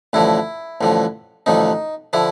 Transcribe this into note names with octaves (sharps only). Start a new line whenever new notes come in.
A1 G2 D3 F3 E4
A1 G2 D3 F3
A1 G2 D3 F3 D#4
D3 F3 E4